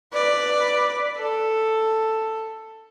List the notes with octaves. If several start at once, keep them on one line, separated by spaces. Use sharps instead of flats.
B4 D5
A4